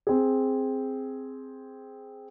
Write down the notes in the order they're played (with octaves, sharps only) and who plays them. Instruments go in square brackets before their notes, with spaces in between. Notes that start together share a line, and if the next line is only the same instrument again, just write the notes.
[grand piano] C4 G#4